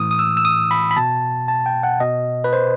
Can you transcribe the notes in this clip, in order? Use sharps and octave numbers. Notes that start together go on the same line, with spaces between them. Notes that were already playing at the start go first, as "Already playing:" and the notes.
Already playing: A2 E3 D#6
D#6
E6
E6
D#6
B5
B5
B2 A5
A5
G5
F#5
B2 D#5
B4
C5